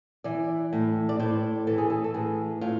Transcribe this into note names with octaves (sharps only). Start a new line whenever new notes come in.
E3 D5
A2
D5
A2 C5
E3 A4
G#4
A4
A4
A2 G#4
A2 F4